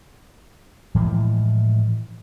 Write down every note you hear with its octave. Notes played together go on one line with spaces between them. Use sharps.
A2 E3 F3 G#3